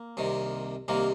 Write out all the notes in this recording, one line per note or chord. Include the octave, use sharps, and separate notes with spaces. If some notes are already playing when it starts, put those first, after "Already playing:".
Already playing: A#3
C2 C3 D#3
C2 C3 D#3 A#3